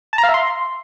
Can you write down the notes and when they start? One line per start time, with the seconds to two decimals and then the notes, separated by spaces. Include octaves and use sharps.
0.13 A5
0.18 A#5
0.23 F5
0.29 E5
0.34 C6